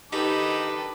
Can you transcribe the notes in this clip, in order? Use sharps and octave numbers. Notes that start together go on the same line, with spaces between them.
D#3 D#4 G4 A4 B4 A5 D6